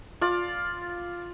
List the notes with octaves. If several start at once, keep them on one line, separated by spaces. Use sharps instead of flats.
F4 D5